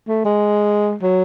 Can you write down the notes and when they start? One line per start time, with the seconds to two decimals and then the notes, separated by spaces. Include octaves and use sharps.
0.09 A3
0.25 G#3
1.02 F#3